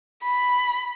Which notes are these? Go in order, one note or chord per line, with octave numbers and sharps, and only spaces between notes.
B5